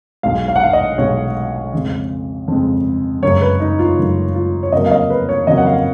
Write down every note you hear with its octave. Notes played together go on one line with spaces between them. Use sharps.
B1 B2 G#3 F5
F5
F#5
F5
D#5
B1 B2 G#3 C#5
F2 C#3 G#3
F2 C#3 G#3
F#2 C#3 G#3 C#5
B4
D#4
F4
F#2 C#3 G#3
F4
C#5
F2 C#3 F#3 A#3 D#5
F5
D#5
B4
C#5
F2 C#3 F#3 A#3 D#5
F#5
F5